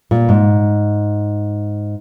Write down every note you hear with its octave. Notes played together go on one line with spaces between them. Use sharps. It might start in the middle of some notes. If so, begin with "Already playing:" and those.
A#2
G#2